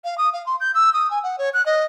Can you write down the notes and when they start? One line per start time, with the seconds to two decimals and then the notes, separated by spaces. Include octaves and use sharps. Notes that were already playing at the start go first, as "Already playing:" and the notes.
0.04 F5
0.17 D#6
0.33 F5
0.46 C6
0.60 G6
0.74 E6
0.93 D#6
1.10 G#5
1.23 F#5
1.38 C#5
1.53 F#6
1.65 D#5